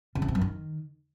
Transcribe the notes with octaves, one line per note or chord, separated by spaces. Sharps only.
C#3
E2
C3
F#2
D#3